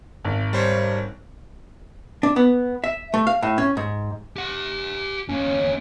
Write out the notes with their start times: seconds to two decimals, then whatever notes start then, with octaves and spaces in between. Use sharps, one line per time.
0.25 G#1
0.53 G3 C5 C#5
2.23 D4
2.36 B3
2.84 E5
3.14 A3
3.27 F5
3.42 A2
3.58 C#4
3.77 G#2
4.37 G4 F#5
5.29 E2 A#3 C#4